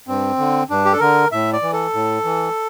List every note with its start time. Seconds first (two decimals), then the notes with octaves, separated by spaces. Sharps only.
0.07 G2 C4
0.38 D3
0.70 G2 D4
0.85 G4
0.93 A4
1.00 D3 A#4
1.32 A2 E5
1.53 D5
1.62 E3
1.73 A4
1.94 A2
2.24 E3